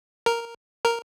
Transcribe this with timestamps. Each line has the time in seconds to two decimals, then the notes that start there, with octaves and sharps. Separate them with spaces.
0.26 A#4
0.85 A#4